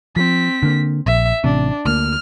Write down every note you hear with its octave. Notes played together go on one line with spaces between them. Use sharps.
F3 C4 B6
D3 A#3
A#1 E5
A1 C3 D4
D2 A#3 F6